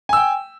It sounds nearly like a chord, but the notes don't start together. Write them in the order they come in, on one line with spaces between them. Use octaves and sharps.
G#5 E6 G5